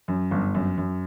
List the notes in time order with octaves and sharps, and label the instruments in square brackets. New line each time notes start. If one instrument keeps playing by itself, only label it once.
[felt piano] F#2
G1
F#2
F#2